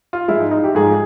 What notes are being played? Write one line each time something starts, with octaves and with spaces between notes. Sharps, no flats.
F4
G#2 F3 G#3 E4
D#4
D#4
G4
G#2 F3 G#3 G#4